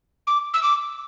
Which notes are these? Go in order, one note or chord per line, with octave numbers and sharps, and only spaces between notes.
D6
E6
D6